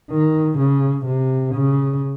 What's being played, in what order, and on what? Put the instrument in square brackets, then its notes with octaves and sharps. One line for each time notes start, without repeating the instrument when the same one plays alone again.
[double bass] D#3
C#3
C3
C#3